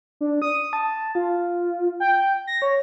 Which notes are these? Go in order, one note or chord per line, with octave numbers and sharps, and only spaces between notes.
D4
D#6
A5
F4
G5
A#6
C#5